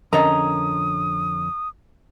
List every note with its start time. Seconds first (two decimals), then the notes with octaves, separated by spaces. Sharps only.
0.13 F2 D3 C#4 A#4 D#5 A#5 D#6